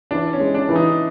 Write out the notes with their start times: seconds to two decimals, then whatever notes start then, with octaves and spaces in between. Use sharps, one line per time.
0.11 E3 D4
0.33 C#4
0.40 G#3
0.54 D4
0.69 E3
0.76 D#4